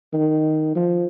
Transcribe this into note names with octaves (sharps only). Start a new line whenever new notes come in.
D#3
F3